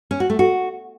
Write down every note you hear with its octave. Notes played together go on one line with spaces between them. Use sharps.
C#4
F#4
A3
F#4